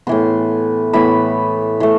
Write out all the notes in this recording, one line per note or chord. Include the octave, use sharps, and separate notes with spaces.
A2 E3 B3 C6
A2 E3 B3 B5
E3 A3 C6